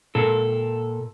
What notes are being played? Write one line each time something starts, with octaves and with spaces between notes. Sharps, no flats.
A#2 A4